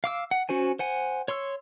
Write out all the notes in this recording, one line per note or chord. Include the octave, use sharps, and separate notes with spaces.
F5 D6 E6
F#5
C#4 F#4 C5 G#5
C5 F#5 G#5
C#5 C6 C#6 E6